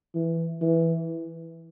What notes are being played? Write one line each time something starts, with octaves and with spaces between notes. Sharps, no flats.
E3
E3